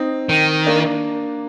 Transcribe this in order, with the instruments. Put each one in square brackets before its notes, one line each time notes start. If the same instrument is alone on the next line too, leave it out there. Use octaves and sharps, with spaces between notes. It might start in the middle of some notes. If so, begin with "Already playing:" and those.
Already playing: [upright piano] C4 D#4
[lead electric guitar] D#3
[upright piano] A#3 D4